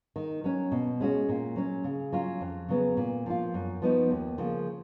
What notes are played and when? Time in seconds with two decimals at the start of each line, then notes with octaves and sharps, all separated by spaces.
0.16 D#3
0.44 F#3 C#4
0.71 B2
1.00 G#3 C#4 F#4
1.29 A#2
1.56 F#3 C#4
1.84 C#3
2.12 F#3 C#4 F4
2.41 F2
2.69 C#3 F#3 B3
2.97 A#2
3.26 F3 A#3 F4
3.54 F#2
3.82 F3 B3 D#4 F#4
4.11 D#2
4.38 C#3 F3 A#3